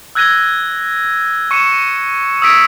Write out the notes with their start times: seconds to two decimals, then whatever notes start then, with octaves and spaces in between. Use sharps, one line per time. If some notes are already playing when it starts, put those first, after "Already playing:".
0.15 E6 F#6 G#6 A#6 D#7 G7
1.51 C#6 C#7 D#7 E7
2.42 D#6 E6 G#6 A#6 B6 D7